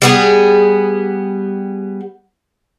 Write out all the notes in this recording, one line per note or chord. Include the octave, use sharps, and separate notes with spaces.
G3 B3 G#4